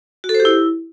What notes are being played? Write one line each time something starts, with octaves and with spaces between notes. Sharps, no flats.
F#4
A4
C5
G4
E4